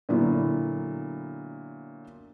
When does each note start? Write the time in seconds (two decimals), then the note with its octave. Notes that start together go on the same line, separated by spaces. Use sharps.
0.09 A#2 D3 F#3 B3 E4